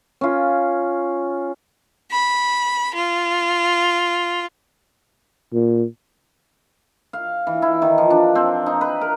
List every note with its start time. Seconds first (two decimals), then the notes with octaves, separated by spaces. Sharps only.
0.21 C#4 F4
2.11 B5
2.93 F4
5.53 A#2
7.13 F5
7.47 E3
7.62 E4
7.82 D#3
7.98 F3
8.10 D4
8.35 C4
8.66 D#4
8.81 B4
9.01 A#4